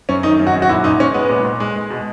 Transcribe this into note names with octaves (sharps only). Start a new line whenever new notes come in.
F#2 C#4
D#3 D#4
F#2
F#4
F#2
F#4
A#2 E4
A#2 D#4
G#3 C#4
G#3 B3
A#2
A#2
G#3
G#3
B2